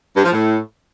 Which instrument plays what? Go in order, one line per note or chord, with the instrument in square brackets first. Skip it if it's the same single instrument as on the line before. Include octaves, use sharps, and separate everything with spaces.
[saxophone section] G2
F3
A2